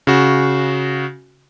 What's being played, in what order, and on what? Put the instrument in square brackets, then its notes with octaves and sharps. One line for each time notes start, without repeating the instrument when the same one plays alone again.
[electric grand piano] C#3 F#4